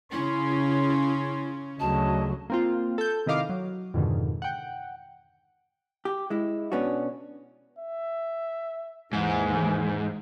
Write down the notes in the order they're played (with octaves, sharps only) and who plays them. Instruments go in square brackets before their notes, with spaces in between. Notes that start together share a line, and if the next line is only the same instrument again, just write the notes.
[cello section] C#3 C#4 [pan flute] E4 [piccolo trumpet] C6
[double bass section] D2 C#3 F#3 [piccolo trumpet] D#5 [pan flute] A5
[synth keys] A#3 C4 F4
A4 G6
C3 D#3 E4 D#5 F5 D6
F#3
F2 G#2 B2 D3 D#3
F#5 G5
[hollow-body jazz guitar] G4
G#3 E4
B2 B3 C#4 D4 F#4
[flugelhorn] E5
[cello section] D#2 E3 [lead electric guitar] G#2 [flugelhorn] G#4